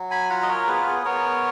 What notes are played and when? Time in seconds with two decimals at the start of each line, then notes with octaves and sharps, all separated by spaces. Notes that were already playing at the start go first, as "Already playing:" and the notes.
Already playing: F#3
0.11 G#5 B5
0.30 F4 F#5 A#5
0.43 D#5
0.49 A#4 C#5
0.67 B3 G#4 B4
0.87 G#4
1.05 B3 A#4 C#5